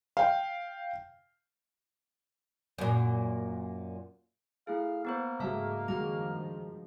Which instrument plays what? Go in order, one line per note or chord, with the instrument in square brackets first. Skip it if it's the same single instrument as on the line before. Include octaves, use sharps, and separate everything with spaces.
[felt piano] F5 G5
[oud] F#2 A#2
[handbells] A3 E4 G#4 [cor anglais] F5
[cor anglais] A#3 [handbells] B3 B4 C5
[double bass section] G#2 [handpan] C#3 G#3 F#4 [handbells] A3 E5 A5
[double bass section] G2 D#3 F3 [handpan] G#3 F#4 [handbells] A#5 F6